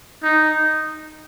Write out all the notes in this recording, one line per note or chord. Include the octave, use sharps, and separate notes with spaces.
D#4